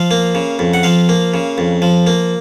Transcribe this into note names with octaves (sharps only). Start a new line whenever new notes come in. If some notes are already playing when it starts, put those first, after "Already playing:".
Already playing: F3 F5
A#3
C#3
F2
F#5
F3 F5
A#3
C#3
F2
F3
A#3